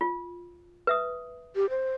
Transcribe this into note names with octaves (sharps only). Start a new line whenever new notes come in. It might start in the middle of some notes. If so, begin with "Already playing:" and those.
F4
B4 E5 D#6
G4
C5